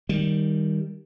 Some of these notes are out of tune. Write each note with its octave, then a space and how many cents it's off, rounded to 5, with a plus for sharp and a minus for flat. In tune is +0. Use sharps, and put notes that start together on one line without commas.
D#3 +0 G3 +0